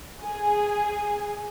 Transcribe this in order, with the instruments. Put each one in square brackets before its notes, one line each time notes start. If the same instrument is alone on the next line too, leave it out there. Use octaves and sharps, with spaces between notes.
[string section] G#4